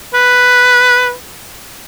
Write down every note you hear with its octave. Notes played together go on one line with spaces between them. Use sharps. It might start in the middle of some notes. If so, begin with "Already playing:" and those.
B4